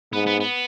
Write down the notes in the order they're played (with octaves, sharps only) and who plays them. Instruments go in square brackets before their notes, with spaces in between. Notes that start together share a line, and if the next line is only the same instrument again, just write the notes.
[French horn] G#2 [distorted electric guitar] B3
[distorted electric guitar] B3
B3